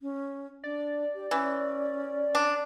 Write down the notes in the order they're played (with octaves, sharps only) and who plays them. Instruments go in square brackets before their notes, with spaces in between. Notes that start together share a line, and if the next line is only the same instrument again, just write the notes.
[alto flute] C#4
[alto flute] D4 [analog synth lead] D5
[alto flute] G4
[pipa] E3 [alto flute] C#4
[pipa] D4